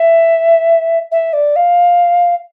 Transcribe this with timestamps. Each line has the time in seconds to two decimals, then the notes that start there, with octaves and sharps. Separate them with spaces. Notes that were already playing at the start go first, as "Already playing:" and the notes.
Already playing: E5
1.11 E5
1.33 D5
1.56 F5